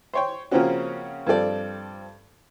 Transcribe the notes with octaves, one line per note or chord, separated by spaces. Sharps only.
C5 C#5 G5
C#3 F3 A#3 C4 C#4 F#4
G2 F3 C4 A4 D5